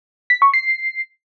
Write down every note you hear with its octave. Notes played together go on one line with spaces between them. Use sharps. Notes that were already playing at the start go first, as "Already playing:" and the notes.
B6
C#6
C7